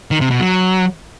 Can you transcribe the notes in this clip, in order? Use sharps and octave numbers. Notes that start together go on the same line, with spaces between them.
D#3
C3
B2
F#3